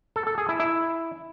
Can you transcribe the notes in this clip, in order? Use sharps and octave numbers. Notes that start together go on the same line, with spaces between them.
A4
A4
G#4
E4
E4